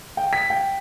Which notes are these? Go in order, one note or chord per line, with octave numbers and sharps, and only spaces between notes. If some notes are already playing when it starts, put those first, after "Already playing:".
G5
B6
G5